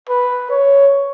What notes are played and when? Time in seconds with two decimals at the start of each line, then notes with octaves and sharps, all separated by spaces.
0.09 B4
0.50 C#5